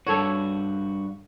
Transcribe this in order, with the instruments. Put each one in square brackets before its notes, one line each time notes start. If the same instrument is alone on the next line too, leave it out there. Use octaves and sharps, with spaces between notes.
[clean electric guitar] G2 F#4 [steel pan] A4 C#5